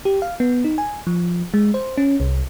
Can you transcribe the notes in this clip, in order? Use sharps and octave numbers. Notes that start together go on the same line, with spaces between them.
G4
F5
B3
D#4
G#5
F3
G#3
C5
C#4
C2